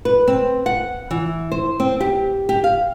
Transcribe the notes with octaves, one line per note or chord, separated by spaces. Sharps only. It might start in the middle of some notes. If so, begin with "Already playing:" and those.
B4
C4
F#5
E3
C5
C4
G4
G4
F5